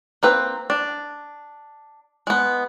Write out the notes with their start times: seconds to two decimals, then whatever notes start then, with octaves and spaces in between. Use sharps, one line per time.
0.23 A#3 C4 B4
0.70 D4
2.27 G#3 B3